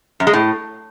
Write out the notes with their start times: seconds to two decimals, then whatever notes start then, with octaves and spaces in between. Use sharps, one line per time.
0.20 F#2
0.27 G#3
0.33 A2